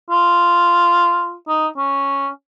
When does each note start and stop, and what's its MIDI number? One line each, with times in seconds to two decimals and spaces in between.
0.10 1.35 65
1.48 1.67 63
1.78 2.27 61